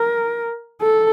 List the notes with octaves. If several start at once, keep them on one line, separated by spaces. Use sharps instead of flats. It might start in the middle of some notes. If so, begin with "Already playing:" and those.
Already playing: A#4
A4